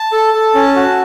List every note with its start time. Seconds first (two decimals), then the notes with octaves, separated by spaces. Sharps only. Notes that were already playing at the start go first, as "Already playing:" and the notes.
Already playing: A5
0.12 A4
0.34 A4
0.55 C#4
0.76 F#4